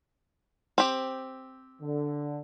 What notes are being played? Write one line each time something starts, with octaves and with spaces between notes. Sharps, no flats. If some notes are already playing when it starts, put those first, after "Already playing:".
C4 G4
D3